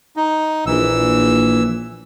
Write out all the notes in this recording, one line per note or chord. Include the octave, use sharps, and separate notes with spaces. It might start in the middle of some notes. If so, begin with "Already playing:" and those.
D#4
A#1 E3 E6